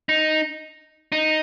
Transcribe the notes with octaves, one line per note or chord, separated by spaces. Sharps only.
D#4
D#4